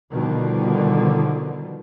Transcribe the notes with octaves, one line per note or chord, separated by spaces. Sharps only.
B2 D3 D#3 F3 G3